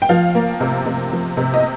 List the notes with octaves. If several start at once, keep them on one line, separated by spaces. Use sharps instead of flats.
G5
F3 F5
A#3
C3
C3
F3
C3
D#5